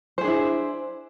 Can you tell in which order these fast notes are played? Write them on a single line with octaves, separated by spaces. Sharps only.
C5 G#4 D4 E4